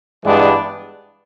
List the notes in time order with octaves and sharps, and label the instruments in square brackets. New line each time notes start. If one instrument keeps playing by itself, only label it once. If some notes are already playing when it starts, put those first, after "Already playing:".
[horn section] G2 E3 G#3 B3 D4